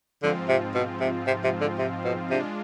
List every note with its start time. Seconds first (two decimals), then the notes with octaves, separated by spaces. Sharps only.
0.23 G#2 D3 F3 C4 F4
0.48 C3
0.75 B2
1.00 C3
1.27 C3
1.44 C3
1.61 D3
1.78 C3
2.05 B2
2.30 C3 G#3 D4 F4